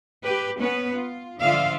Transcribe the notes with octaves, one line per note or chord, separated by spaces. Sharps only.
G4 B4
B3 C#4 B4
F4
D3 F3 F4 D5 E5 F5